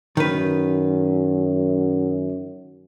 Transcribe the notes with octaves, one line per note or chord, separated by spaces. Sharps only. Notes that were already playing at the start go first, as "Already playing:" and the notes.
F#2 D#3 B4